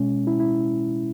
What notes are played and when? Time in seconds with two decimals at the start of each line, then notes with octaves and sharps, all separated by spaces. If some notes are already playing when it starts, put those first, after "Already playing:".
Already playing: B2 G#3 C#4
0.27 E4
0.40 E4